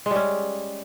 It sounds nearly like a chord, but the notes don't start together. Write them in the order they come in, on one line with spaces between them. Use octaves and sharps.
G#3 G3 C#4